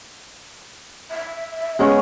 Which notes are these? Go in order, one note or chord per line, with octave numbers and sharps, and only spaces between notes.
E5
G#3 B3 C#4 C#6